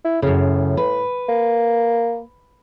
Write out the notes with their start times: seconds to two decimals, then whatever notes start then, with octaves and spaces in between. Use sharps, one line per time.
0.05 E4
0.22 F#2 A2 C#3
0.77 B4
1.29 A#3